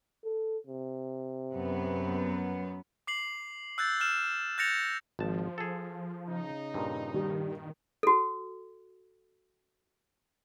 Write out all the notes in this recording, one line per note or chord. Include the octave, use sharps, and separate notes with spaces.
A4
C3
F#2 B3
D6 C7 F#7
E6 F#6 G6 A6
F6 E7
F#6 G6 A6 A#6 C#7 F7
G#1 F3 A5
G#4 A4
C#3 D#4
G2 A#2
D#3 G3
F#4 A4